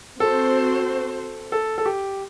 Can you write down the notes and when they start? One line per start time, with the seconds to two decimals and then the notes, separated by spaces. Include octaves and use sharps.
0.20 C4 F#4 A4 C5
1.52 A4
1.78 A4
1.86 G4